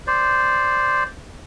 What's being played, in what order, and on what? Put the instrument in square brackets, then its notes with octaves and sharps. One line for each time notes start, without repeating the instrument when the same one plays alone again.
[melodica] C5 D5